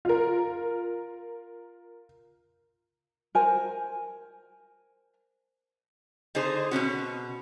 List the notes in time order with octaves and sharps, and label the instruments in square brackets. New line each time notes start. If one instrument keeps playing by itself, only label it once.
[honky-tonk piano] F4 A#4
[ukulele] A#4 C5 G#5
[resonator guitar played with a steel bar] D3 D#4 G#4 C5
B2 A#3 C#4 F#4